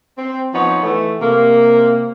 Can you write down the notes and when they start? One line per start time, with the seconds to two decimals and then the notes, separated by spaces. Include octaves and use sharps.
0.18 C4
0.53 F3 B3 D#4 B4 C#5
0.83 E3 A3
1.20 C3 A#3